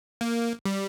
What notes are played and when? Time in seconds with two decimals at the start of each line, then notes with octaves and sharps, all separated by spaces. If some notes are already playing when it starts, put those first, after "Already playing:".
0.21 A#3
0.66 G3